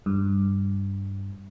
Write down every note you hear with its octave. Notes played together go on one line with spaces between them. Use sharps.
G2